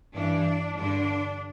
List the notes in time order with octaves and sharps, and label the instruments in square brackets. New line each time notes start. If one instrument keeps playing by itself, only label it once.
[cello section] G2 E3 D4
G2 D3 D4